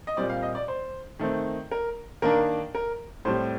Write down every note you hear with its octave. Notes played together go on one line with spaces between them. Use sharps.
D#5
A#2 G3 C4 D5
F5
D#5
D5
C5
D#3 A3 C4
A#4
D#3 A#3 D4 A#4
A#4
A2 G3 C4 C5